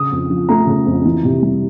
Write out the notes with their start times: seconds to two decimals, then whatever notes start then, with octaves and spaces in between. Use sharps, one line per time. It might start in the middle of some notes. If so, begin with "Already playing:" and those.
Already playing: C#3 D#6
0.12 F2
0.30 F3
0.49 A3 A#5
0.67 C#3
0.86 F2
1.05 E3
1.24 C3
1.42 G3